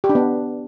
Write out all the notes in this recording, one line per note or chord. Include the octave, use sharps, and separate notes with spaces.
G4
D4
B3